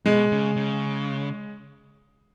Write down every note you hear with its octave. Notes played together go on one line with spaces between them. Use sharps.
B2 G#3
C#3
C#3